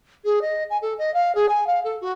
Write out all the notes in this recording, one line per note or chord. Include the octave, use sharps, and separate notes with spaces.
G#4
D#5
G#5
A4
D#5
F5
G#4
G#5
F5
A4
F#4